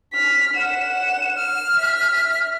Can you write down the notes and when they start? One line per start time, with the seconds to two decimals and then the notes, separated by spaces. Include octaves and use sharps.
0.13 F6 B6
0.55 F#5 E7
1.36 F6
1.78 E5 B6